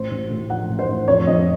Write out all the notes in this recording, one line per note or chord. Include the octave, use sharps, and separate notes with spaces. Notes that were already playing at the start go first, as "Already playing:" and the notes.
Already playing: A1 C5
A1
A2
F3 F#5
A1
C5
A1
F2 C#5
F2 D#5